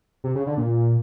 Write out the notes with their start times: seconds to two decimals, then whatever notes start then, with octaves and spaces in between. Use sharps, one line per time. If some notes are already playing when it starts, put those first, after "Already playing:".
0.24 C3
0.35 C#3
0.47 D3
0.57 A#2